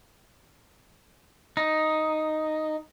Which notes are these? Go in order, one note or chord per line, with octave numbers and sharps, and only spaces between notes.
D#4